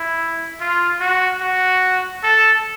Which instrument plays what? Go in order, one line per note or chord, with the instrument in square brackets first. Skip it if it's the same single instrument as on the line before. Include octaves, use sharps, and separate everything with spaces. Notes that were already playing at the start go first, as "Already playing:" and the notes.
Already playing: [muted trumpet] E4
F4
F#4
F#4
A4